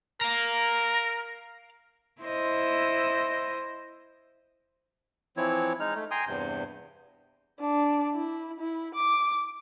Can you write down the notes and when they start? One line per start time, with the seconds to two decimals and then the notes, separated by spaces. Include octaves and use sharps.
0.21 A#4 F5 A#5
2.22 E4 C5 D#5
5.37 E3 F3 C4 E4 C#5
5.80 G#3 D#4 F6
5.95 A3
6.11 G5 G#5 A#5 C6 D#6
6.27 E2 G2 C3 G6
7.60 D4
8.14 E4
8.60 E4
8.94 D6